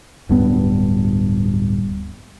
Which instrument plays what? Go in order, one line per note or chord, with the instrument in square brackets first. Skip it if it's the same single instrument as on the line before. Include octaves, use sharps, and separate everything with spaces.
[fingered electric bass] D1 G2 B3